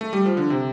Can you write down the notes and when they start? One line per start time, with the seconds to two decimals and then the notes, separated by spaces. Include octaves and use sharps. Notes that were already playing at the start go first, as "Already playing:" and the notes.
0.01 A3
0.13 G3
0.26 F3
0.37 D3
0.50 C3